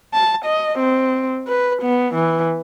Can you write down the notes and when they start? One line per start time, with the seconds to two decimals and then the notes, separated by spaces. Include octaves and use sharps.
0.14 A5
0.45 D#5
0.79 C4
1.48 B4
1.83 B3
2.15 E3